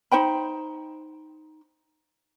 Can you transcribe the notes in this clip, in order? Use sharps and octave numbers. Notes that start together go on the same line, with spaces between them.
D#4 C5 G5 B5